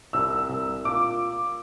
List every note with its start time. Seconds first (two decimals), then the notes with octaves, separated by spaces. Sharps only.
0.13 C2 E6
0.49 C2
0.85 A#2 D6